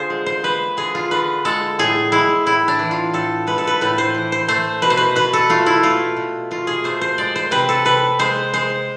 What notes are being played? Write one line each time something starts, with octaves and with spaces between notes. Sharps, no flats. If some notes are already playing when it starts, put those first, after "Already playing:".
Already playing: D3 F4 G#4 C5
G#3
C5
G#3 B4
D3 G#4
F4
D3 B4
G#3 A4
A2 G#4
G#3 E4
A2 E4
D4
E3
F4
A2 A4
G#3 B4
A4
B4
A2 B4
C5
E3
C5
A3 C5
B2 B4
C5
B4
B2 B4
A4
A3 F4
E4
A3 F4
B2
B2 F4
G#4
A3 C5
C5
G#3 D5
C5
C3 B4
A4
C3 B4
G#3 C5
G#3 C5